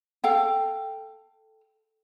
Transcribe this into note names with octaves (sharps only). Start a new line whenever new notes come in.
A4 F5 G5